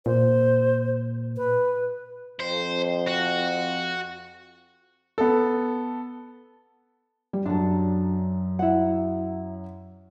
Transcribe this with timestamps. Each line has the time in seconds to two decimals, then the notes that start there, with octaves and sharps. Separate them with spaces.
0.06 A#2 C5
1.37 B4
2.40 F2 C5
3.08 F#4
5.18 B3 A4
7.33 G3
7.46 F#2 F#3 D4 A4
8.59 E4 F#5